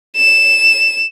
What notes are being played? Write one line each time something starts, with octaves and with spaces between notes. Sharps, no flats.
E7